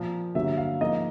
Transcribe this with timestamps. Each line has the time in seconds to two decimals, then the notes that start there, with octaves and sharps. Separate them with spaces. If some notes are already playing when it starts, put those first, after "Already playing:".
Already playing: A#2 F3 A#3
0.35 G2 D3 F#3 A#3 E5
0.57 F5
0.80 G#2 F3 A#3 D#5